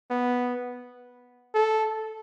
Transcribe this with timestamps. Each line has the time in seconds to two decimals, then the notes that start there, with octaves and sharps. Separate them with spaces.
0.10 B3
1.55 A4